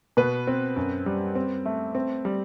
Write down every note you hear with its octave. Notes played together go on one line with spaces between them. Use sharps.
B2 B4
C4
F#2
G3
C4
A3
C4
G3